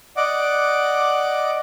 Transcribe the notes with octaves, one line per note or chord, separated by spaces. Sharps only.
D5 D#5 F#5 D6